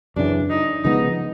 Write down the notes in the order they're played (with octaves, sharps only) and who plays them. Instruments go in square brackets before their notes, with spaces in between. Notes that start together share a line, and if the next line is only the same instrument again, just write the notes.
[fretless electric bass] F#2 C#3 E3 [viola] D4
[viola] D#4
[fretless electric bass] C#3 F3 G#3 B3 [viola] D#4